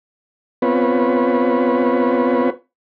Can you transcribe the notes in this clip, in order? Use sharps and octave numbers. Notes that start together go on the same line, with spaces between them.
B3 C4 F4 B4 C#5